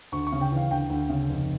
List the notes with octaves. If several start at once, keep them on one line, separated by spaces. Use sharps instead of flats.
D2 C#6
C#6
C#3
G5
E3 F5
D2 G5
D2
C#3
F1